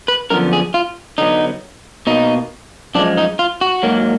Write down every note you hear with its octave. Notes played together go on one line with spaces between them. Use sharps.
B4
F#2 D3 F3 B3 A#4
G#4
F4
D3 F#3 B3 D#4
B2 A#3 D#4
F#2 F3 G#3 D4
D#4
F4
F#4
G#2 F#3 A#3